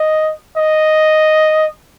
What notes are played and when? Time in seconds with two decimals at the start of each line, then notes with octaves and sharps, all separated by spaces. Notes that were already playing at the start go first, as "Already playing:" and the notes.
Already playing: D#5
0.57 D#5